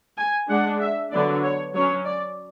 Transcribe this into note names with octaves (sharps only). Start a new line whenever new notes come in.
G#5
G#3 D4 F#5
E5
D3 F#3 B3 D4 D5
C#5
F#3 C#4 C#5
D5